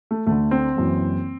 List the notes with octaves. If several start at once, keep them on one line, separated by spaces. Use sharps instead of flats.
A3
D2 D3 A3
C4
F#1 F#2 E3